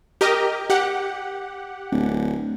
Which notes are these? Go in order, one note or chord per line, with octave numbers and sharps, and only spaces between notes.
G4 A#4 D#5
G4 F#5
D1